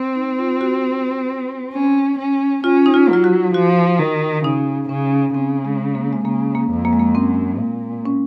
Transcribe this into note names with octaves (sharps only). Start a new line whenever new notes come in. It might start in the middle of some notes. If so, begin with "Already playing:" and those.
Already playing: C4
D#4
F4
F#4
C#4
C#4
C#4 F4
D#4
F4
F#3 F4
F#4
F3 F#4
D#3
C#3 D#4
C#3 C#4
C#3 C4
G#3
A#3
G#3
C#3 A#3
A#3
F2
A#3
G#3
A#3
F#2 C4
A#2
C#4